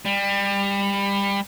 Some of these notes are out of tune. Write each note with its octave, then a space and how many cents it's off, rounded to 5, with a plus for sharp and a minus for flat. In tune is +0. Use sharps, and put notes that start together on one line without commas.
G3 +25